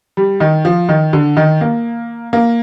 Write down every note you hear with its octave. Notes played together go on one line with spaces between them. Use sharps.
G3
D#3
F3
D#3
D3
D#3
A#3
A#3